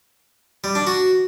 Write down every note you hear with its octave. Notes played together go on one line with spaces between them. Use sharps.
G3
D4
F#4